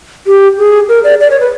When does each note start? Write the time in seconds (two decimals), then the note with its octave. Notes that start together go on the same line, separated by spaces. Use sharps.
0.27 G4
0.58 G#4
0.89 A#4
1.04 D5
1.21 D5
1.31 C#5
1.40 B4